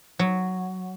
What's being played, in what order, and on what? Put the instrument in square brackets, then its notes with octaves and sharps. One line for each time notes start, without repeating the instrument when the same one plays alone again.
[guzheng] F#3